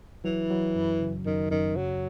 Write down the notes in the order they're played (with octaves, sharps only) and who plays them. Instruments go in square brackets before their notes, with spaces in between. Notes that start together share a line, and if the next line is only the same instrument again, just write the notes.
[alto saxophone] E3 [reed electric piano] F#3
[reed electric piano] F#3
F#2
C#3
[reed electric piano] F#2 [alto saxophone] D#3
[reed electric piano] F#2 [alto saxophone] D#3
[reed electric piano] C#3 [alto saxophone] F#3